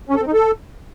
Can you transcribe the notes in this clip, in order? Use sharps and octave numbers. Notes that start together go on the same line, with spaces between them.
C#4
A4
C4
D#4
A4